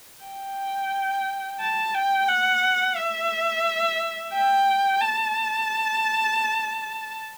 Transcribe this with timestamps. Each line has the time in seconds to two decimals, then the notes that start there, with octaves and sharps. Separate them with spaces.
0.24 G5
1.60 A5
1.94 G5
2.29 F#5
2.97 E5
4.33 G5
5.01 A5